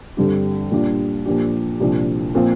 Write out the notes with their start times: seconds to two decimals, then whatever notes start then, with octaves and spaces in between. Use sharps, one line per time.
0.17 G2 D3 G3 C4 G4
0.71 A#2 G3 D4 F4
1.26 A#2 F3 D4 G4
1.80 C2 A#2 F3 D4
2.35 A#2 F3 C4 F4